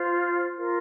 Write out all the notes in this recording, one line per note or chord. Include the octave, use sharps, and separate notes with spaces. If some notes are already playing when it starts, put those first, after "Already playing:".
Already playing: F4 C5
F4 A#4